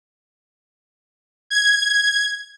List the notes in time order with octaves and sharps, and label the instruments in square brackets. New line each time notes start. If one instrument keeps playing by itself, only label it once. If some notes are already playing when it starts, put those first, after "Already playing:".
[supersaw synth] G#6